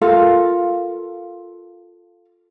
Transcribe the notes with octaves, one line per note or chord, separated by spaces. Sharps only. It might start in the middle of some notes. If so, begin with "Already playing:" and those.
F4 A4 A#4 F5